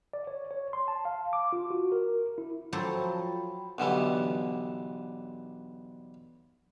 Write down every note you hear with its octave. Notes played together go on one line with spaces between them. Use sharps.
D5
C#5
C#5
C6
A5
F5
D6
F4
F#4
A#4
E4
F3 F#3 A4 C5 G5 B5
B1 D3 E3 G3